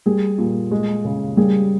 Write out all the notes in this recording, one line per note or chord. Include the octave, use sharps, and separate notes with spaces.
G3 G#4
A#2
G#3
C#3
G3 G#4